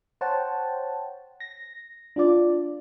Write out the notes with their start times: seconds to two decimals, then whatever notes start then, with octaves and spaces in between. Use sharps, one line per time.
0.21 C5 C#5 F#5 G5 A5
1.40 A#6
2.16 D4 F4 D5